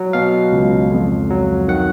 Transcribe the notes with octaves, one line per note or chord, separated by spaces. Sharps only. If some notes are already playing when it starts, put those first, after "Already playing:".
Already playing: F#3
B2 F5
C#2
F2
F#3
D#3 F#5